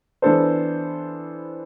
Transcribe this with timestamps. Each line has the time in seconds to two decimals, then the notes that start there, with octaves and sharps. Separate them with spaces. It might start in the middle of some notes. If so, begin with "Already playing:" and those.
0.22 E3 B3 D4 A4 C5